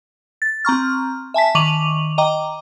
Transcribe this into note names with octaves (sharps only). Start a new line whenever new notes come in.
A6
C4 A#5 C#6 F6
E5 G#5 A5 B6
D#3 C#6 D6 D#7 F7 F#7
D#5 G5 A#5 D6